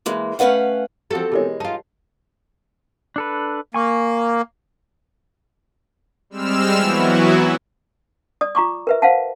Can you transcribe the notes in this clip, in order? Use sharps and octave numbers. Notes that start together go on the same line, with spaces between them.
E3 G#3 A#3
A3 C#4 B4 F5 F#5
F3 C4 F#4 G4 A4
B2 E3 G#3 G4 A#4 C#5
D#4 F4 A5
D4 A4 B4
A#3 G#5 C#6
G3 G#3 C4 E6 F6 E7
E3 F#3 B3 E4 F#4
D5 D#6
F4 A#5 C#6 D6
A#4 B4 E5
C5 F5 F#5 A5